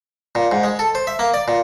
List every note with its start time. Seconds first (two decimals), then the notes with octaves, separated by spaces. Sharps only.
0.35 A#2
0.51 G#2
0.63 G#3
0.79 A4
0.95 C5
1.07 E5
1.19 A#3
1.34 D5
1.48 A#2